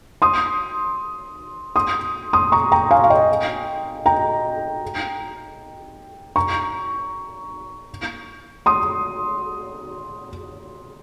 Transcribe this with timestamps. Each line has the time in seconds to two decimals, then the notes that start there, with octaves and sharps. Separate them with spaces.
0.22 C6 D#6
1.76 C6 D#6
2.33 C6 D#6
2.52 A#5 C#6
2.72 G5 A#5
2.91 F5 G#5
3.04 F5
3.10 D#5 G5
4.06 G5 A#5
6.36 A#5 C#6
8.66 C6 D#6